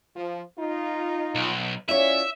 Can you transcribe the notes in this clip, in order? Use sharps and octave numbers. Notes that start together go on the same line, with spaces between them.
F3
D#4 F4
B1
C#4 E4 F4 C#5 D5 E5